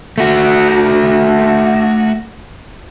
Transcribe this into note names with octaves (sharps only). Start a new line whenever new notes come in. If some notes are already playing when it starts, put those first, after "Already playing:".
A3 F#4